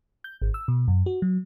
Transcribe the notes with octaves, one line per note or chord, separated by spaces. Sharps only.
G6
G#1
E6
B2
F#2
F#4
F#3